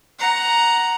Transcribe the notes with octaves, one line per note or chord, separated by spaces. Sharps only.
F#5 A#5